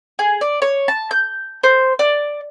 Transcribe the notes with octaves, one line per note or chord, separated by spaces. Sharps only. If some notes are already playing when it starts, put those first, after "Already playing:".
G#4
D5
C#5
A5
G6
C5
D5